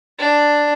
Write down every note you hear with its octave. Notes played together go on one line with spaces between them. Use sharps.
D4